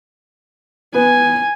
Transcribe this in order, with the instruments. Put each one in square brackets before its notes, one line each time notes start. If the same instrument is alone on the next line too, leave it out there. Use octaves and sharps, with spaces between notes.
[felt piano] B3 [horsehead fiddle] G#5